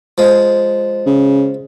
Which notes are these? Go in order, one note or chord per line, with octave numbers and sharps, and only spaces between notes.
F3 G#3
C#3